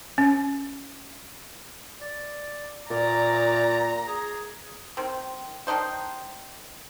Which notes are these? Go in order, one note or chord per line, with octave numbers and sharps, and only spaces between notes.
C#4
D5
A#2 D5 A#5
G#4
D#3 C4
D#3 D4 D#4 C5